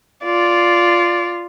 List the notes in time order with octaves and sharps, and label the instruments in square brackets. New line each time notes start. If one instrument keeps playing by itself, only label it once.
[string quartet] F4 [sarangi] D5